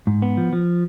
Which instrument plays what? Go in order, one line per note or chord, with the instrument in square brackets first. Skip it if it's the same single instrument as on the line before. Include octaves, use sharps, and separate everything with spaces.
[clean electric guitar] G#2
B3
F3
F3